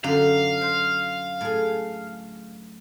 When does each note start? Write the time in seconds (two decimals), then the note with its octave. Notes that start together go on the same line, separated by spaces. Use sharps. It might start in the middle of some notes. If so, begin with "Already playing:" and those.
0.04 F#2 D3 F5 B5
0.61 C5
1.41 A2 G#4